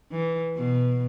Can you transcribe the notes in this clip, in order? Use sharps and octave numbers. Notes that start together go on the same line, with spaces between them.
E3
B2